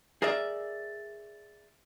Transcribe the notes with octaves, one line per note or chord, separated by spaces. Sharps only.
G#4 A#4 D5 E5